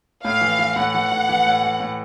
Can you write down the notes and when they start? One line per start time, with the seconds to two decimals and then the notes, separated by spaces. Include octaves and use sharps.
0.25 A2 F5
0.41 E3
0.59 E3
0.76 A2 F#5
0.95 E3
1.12 A2
1.29 E3
1.46 A2
1.64 E3
1.80 A2